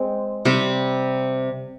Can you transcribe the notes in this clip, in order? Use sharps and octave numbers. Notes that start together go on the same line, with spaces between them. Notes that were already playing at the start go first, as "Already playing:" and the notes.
Already playing: G#3 C4
C3 G3 C4